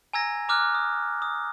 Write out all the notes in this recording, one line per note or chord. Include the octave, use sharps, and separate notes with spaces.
G#5 A#5 E6 G#6 A#6
A#5 D6 F6 F#6
D#6
D#6